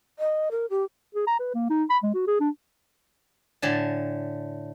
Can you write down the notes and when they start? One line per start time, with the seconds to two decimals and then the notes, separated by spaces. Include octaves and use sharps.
0.19 D#5
0.51 A#4
0.70 G4
1.15 G#4
1.27 A#5
1.40 B4
1.54 A#3
1.70 D#4
1.90 B5
2.03 G#3
2.14 F#4
2.27 G#4
2.40 D4
3.62 A2 D3 G#5 A5